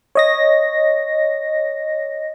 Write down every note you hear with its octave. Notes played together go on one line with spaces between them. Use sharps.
C#5 D#5 A#6